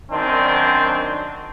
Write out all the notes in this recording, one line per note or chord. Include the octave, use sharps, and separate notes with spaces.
F#2 D#3 C4 D4